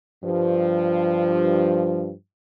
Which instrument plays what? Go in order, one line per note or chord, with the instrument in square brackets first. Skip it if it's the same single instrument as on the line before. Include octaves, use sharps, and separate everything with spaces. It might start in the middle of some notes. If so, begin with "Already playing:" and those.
[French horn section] G2 F3